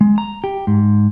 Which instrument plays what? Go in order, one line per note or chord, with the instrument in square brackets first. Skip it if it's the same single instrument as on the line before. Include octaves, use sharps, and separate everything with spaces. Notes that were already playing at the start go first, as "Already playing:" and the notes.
[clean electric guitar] G#3
A#5
G4
G#2